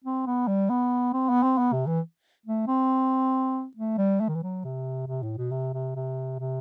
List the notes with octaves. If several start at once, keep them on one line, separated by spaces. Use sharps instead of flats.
C4
B3
G3
B3
C4
B3
C4
B3
C3
E3
A3
C4
A3
G3
A3
D#3
E3
F#3
C3
C3
A2
B2
C3
C3
C3
C3